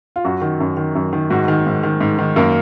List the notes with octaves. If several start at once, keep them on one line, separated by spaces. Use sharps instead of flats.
F4
F#2 F#4
D#3
F#2
D#3
F#2
D#3
G#2 F#4
D#3
G#2
D#3
G#2
D#3
F#2 A#3 A#4